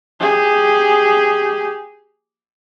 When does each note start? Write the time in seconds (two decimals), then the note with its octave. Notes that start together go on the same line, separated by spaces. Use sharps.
0.20 G4 G#4